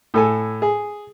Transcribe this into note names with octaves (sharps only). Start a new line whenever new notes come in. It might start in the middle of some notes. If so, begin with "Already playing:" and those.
A2 A4 G#5
G#4